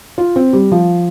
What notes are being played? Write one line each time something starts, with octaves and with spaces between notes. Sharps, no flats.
F4
C4
G3
F3